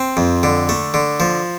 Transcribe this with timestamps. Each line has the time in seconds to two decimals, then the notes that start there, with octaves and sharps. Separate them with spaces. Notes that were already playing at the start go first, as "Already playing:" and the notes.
Already playing: C4
0.17 F2
0.43 D3
0.69 A3
0.94 D3
1.20 F3